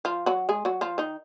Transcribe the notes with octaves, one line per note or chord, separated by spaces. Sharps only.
F3 F4
F#3 F#4
G#3 G#4
F#3 F#4
F3 F4
D#3 D#4